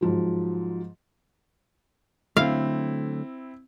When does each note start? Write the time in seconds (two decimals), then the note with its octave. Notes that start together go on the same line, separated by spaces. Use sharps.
0.01 G#2 F3 F#3
2.37 D3 F#3 A3 C4 E4 F5